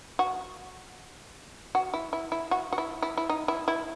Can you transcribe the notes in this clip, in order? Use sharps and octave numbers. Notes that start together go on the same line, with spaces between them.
F#4
F#4
E4
E4
E4
F#4
F#4
E4
E4
E4
D#4
E4
E4